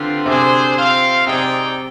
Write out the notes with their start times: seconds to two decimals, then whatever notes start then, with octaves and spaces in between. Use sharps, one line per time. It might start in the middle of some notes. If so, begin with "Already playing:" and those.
Already playing: D3 G3 C4 F4 B4
0.26 C3 D4 G#4 C5
0.76 C4 F4 C5 F5
1.26 C3 C4 D#4 G#4 D5 G5